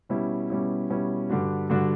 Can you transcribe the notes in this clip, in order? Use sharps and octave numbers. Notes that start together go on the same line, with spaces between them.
B2 G3 C#4 E4
B2 G3 C#4 E4
B2 G3 C#4 E4
G2 D3 G3 D4 F#4
G2 D3 G3 D4 F#4